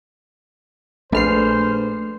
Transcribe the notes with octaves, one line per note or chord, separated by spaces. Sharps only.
A#1 A3 D4 G#4 B4 C5 F6 C7